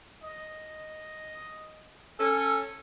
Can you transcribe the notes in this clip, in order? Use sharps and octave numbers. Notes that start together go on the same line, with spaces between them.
D#5
C#4 A4 G#5